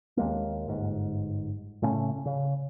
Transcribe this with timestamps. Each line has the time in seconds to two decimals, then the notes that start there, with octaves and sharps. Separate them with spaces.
0.17 D#2 G#3 A#3
0.68 G1 G#2
1.82 A2 C#3 A3 C#4
2.26 C#3